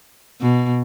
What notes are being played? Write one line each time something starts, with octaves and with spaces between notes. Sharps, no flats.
B2